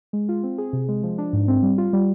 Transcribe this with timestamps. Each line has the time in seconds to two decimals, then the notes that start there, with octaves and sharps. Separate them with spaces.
0.13 G#3
0.29 F4
0.43 C4
0.58 G#4
0.73 C3
0.88 G#3
1.03 F3
1.18 D4
1.33 G#2
1.48 C4
1.63 G3
1.78 F4
1.93 G3